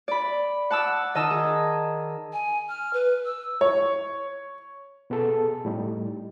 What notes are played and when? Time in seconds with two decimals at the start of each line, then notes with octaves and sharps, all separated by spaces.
0.08 D5 B5
0.70 F#5 A5 D6 E6
1.15 D#3 D#5 A5 E6
1.31 G#4
2.33 G#5
2.69 F6
2.93 B4
3.25 E6
3.61 C#5
5.10 B2 B3 G#4 A4
5.65 A2 G3 D#4